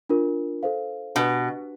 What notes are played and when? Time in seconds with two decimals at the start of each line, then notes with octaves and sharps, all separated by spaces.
0.09 D4 F4 A#4
0.63 A4 C5 F5
1.15 B2 D4 G4 B4